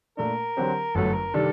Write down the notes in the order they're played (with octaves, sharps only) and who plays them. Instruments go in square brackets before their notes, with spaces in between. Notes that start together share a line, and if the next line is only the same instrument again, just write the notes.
[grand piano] A#2 A3 D4 [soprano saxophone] A#4
[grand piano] D3 F#3 C4 G4 C5
[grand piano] G1 F#2 F#3 A3 [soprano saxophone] A4
[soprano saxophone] A#4
[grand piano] C3 D#3 G3 D4 [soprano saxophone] A4